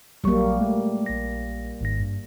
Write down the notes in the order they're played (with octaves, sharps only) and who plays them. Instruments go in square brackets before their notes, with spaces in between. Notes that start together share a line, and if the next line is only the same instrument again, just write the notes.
[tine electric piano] A#1 F#3 C#6 [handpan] G3 A#3
[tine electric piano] G#3 A3
A#1 A#6
G#1 G#2 A#6
G2